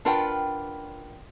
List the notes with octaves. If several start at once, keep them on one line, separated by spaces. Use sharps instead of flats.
D4 F4 A#4 B4 F#5 G5